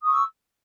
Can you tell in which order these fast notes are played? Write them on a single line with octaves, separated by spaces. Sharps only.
D#6 C#6 E6